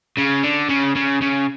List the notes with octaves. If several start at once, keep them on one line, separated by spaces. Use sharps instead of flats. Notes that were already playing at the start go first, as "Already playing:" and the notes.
C#3
D3
C#3
C#3
C#3